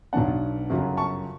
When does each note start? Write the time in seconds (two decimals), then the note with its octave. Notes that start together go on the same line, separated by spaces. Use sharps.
0.13 B1 B2 F#3 B3 D4 F#5 A5
0.70 G1 F#2 C#3 F#3
0.97 A5 C#6